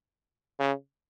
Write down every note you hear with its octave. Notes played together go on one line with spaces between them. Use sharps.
C#3